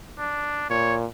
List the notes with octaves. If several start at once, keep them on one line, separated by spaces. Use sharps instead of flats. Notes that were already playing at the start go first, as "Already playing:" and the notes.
D4
A#2 C#5